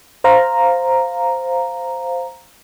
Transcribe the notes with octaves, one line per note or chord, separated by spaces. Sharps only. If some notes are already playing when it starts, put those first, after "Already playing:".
C5 F5 A#5